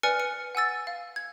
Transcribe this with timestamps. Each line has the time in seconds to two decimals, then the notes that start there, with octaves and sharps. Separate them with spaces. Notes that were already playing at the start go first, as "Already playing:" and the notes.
0.03 B4 D5 G#5 F6 C#7
0.20 C#7
0.55 F#5 G#5 E6 A6
0.87 F5
1.16 G#6